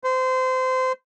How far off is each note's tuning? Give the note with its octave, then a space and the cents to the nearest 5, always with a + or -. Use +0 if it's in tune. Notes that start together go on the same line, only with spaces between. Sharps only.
C5 -25